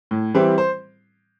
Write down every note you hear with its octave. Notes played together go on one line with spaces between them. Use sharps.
A2
E3 G3 C4 E4
C5